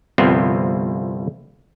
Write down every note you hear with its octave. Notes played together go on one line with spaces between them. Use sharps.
G1 C2 F3 B3 C4